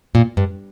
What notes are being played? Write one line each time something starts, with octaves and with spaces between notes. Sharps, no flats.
A#2
G2